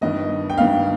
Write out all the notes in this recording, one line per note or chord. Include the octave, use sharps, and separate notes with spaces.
G1 G2 D#3 D#5
G5
G1 G2 D#3 F5